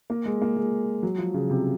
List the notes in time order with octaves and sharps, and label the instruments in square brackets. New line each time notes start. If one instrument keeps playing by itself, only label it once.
[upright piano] A#3
G#3
A#3
G#3
F#3
F3
C#3
C3